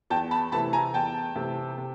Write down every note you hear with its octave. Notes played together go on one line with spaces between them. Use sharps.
E2 G5 A5
A5 B5
C3 E3 A3 A5 B5
G#5 A#5
E2 G5 A5
C3 E3 A3
C3